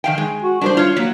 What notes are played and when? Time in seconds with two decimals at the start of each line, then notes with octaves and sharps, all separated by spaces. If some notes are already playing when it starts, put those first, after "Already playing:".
0.04 D#3 F5 G5
0.18 G#3
0.42 F#4
0.61 G3 D4 A#4 C5
0.77 F4 C#5
0.97 F#3 A#3